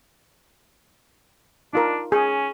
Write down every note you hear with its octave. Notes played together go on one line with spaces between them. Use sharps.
D4 D#4 F4 A#4
C#4 G#4